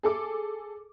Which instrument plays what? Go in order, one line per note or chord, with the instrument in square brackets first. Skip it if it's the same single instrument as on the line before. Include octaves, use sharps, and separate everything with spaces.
[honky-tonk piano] G#4 A4 D6